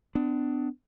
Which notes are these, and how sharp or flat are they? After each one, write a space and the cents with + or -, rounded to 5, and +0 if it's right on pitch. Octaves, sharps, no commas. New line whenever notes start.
B3 +40 D4 +10